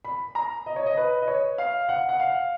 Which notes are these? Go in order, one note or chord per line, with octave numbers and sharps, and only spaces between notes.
B5
A#5
D#5
C#5
D#5
B4
D#5
C#5
F5
F#5
F#5
F5